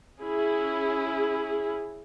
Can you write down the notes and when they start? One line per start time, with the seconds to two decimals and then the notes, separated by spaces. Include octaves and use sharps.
0.20 C#4 E4 G#4